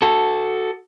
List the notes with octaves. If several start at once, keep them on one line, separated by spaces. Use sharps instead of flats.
F#4 A4